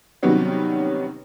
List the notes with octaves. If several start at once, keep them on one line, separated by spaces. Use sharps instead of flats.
C3 D#3 F#3 G3 B3 C#4